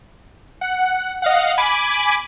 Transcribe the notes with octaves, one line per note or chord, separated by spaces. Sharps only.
F#5
D#5 F5 F#5
G#5 B5 D6